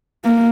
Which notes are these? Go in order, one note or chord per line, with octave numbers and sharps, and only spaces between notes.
A#3